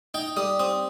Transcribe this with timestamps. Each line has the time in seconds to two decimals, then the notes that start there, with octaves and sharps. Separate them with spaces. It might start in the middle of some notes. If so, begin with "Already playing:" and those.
0.14 D#4 G5
0.37 G3 D#6
0.59 C4 D#6